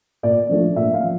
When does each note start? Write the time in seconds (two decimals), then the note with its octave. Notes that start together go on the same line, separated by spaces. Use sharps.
0.23 A#2 D5
0.49 F3 A3 D4
0.76 A#2 E5
0.94 F5
1.03 F3